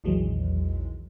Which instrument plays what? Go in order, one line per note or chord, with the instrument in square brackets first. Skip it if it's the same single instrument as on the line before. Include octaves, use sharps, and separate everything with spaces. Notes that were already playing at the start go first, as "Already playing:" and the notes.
[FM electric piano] A#1 E2 D#3 E3 F#3 G#3